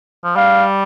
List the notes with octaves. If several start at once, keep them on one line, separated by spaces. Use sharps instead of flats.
F3
G3 F5